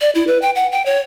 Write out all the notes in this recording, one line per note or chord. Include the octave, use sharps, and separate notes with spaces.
D5
E4
B4
G5
F#5
G5
C#5